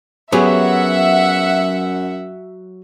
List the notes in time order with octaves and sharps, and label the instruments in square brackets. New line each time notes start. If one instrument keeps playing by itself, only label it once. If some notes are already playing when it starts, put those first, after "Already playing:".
[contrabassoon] F#2 [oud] F#3 [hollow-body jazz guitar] B3 G4 G#4 [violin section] E5 F#5